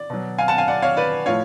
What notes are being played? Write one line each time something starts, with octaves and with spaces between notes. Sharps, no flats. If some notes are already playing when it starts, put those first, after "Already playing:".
Already playing: D5
B2 F#3
F5 G#5
F#5 A5
F5 G#5
D5 F#5
C#5 F5
B4 D5
A2 F3 C#5 F5